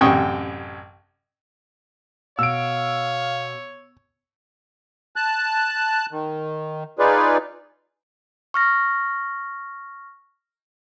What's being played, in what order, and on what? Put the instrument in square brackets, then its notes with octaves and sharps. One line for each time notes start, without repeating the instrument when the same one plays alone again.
[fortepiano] A1 F#2 C3 G5 C#6 D#6
[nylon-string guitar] B2 [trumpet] C#5 [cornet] F5 [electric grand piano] E6 D7
[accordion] A5 F#6
D#3
D#4 F4 G#4 B4 D5
[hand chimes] C#6 F6 A#6